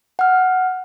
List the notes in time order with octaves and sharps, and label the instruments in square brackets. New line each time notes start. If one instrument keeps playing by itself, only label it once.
[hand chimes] F#5 F6